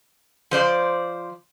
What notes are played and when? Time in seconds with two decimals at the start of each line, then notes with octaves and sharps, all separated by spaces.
0.51 F3 C5 D5